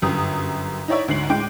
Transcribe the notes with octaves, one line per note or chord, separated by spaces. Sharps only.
G1 F#2 G4 D#6
D#4 E4 C#5 D5 E5
D2 G#2 C7 F#7
A2 G#3 G5 D6